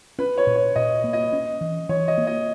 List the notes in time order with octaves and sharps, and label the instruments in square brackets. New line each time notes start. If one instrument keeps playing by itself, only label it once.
[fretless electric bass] C#4 [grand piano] B4
[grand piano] C#5
[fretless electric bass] A#2
[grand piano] C#5
[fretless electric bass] A#2 [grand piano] D#5
[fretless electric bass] A#3
[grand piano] D#5
[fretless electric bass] C#4
E3
[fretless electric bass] E3 [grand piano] C#5
[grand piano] D#5
[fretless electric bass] A#3
[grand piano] D#5